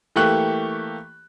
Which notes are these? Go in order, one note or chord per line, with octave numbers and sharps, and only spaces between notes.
E3 A3 A#3 G4 C#6 F#6